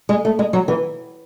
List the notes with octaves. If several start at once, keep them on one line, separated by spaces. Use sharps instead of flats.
G#3
A3
G#3
F#3
E3